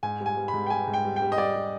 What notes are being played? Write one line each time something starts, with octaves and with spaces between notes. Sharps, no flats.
G#2 G#5
G3
G#5
G3
B5
G#2
G5
G3 G#5
G#2
G5
G3
G5
G3
D#5
G3 D5
G3